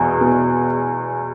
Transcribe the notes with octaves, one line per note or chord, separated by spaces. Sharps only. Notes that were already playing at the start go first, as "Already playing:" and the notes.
Already playing: E2 B2
B2